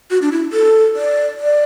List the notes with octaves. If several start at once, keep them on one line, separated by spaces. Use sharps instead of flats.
F#4
D4
E4
A4
D5
D5